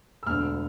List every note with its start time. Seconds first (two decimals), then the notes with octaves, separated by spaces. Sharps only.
0.23 E6
0.27 E1 D2 D3 F6